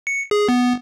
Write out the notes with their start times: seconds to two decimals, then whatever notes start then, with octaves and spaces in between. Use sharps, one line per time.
0.07 C#7
0.31 G#4
0.49 B3